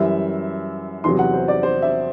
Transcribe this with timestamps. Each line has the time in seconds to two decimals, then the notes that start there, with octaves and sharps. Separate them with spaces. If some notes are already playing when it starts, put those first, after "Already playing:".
Already playing: F#2 E3 G3 E5
1.04 E2 C3 F#3 C6
1.19 F#5
1.33 C5
1.48 D5
1.63 C5
1.82 E5